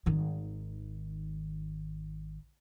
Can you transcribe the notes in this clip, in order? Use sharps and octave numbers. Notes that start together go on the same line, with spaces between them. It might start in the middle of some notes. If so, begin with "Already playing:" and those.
G#1 D#3